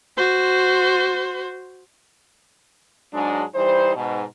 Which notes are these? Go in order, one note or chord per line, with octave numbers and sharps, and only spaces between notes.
F#4 C5
G#2 F#3 G#3 D4
E3 G3 D#4 C5
G#2 B2